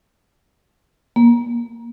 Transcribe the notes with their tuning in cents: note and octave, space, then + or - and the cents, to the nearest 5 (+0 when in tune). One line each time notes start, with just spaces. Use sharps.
A#3 +25